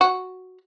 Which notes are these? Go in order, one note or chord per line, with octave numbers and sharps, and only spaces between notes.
F#4